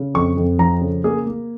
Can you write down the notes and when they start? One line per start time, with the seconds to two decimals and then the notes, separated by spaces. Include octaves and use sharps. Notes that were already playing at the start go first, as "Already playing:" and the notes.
Already playing: C#3
0.14 F2 C#6
0.37 F2
0.58 F3 A#5
0.81 C#3
1.04 A#3 G#4
1.26 A#3